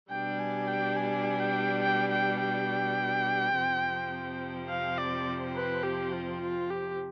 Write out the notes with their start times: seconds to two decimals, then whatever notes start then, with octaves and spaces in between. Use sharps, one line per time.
0.10 B2 G3 D4 G4 G5
0.39 G#5
0.68 G5
0.96 G#5
1.40 G5
1.83 G5
2.12 G5
2.40 G5
3.55 F2 C3 F3 C4
4.69 F5
4.98 D5
5.56 B4
5.84 G4
6.13 F4
6.42 F4
6.70 G4